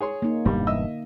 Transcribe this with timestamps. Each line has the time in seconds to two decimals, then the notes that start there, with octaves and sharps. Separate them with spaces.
0.01 G#4 C#5 C6
0.22 A#3 D#4
0.45 E1 G2 D3 E3 G3
0.67 D#5 E5 E6